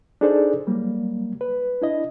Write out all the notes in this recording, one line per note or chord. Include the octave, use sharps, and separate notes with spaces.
D4 D#4 G#4 A4 C5 D5
F#3 G3 A#3
B4
D4 E4 D#5